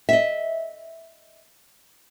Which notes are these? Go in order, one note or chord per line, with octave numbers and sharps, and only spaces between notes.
D#5 E5